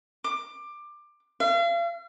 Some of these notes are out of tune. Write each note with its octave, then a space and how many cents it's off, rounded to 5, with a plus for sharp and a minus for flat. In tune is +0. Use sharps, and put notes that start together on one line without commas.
D6 +15
F5 -40